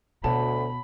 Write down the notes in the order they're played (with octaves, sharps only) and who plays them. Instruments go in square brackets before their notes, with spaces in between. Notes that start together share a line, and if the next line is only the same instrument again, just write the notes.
[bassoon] D2 [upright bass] B2 [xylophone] C#5 F#5 A5 [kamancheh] B5